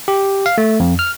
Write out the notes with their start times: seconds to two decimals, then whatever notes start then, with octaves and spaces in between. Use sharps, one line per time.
0.08 G4
0.46 F5
0.58 A3
0.80 F2
0.99 F6